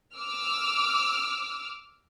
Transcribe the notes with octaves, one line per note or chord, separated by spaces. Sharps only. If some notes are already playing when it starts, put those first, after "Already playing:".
D6 E6 F6